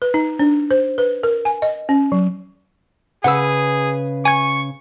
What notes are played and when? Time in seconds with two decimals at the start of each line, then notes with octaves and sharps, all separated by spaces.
0.02 B4
0.14 D#4
0.39 D4
0.71 C5
0.98 B4
1.23 A#4
1.45 G#5
1.62 D#5
1.89 C#4
2.12 F#3
3.24 C#3 G#4 B4 F#5 E6
4.25 G#5 C#6 G#6